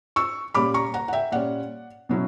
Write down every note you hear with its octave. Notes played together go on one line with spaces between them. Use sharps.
C#6 E6
A#2 G3 C#4 B5 D6
A#5 C#6
F#5 A#5
F#5
E5 G5
A#2 G3 C#4 D5 F#5
B2 F#3 C#4 E4